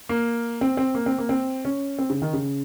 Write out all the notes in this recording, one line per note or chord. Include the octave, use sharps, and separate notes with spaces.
A#3
C4
C4
A#3
C4
A#3
C4
C#4
C4
C#3
D#3
C#3